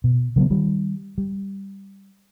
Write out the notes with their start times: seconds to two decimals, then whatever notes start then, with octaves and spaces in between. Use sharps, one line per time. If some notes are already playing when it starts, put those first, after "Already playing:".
0.04 B2
0.36 C#3 F#3 A3 B3
0.50 D#3 G3
1.18 G3